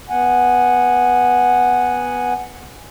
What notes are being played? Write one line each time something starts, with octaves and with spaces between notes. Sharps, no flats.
B3 F#5 G#5